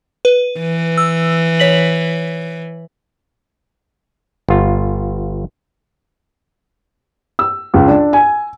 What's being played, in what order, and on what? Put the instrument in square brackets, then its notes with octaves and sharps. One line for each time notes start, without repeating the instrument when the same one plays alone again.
[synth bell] B4
[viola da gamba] E3
[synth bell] E6
C#5 B6 F#7
[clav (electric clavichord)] G1 F4
[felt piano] E6
C#2
D4
G#5